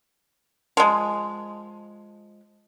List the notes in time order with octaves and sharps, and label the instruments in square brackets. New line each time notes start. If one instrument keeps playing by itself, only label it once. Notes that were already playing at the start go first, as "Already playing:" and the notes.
[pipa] F3 G#3